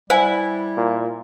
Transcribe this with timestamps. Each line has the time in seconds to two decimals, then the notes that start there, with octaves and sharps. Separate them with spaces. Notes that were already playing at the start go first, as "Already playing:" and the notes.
0.10 G3 E4 C5 F#5 G#5
0.77 A#2